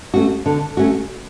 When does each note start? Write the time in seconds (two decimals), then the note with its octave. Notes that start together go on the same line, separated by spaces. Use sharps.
0.14 A3 C#4 F#4
0.46 D3
0.77 A3 C#4 F#4